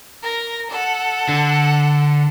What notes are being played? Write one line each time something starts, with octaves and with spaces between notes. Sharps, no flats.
A#4 A#6
A4 F#5
D3